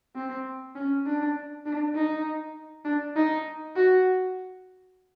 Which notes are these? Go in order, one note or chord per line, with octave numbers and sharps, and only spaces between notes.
C4
C#4
D4
D4
D#4
D4
D#4
F#4